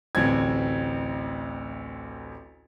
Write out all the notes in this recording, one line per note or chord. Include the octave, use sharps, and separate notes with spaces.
A1 D2 C4 G#6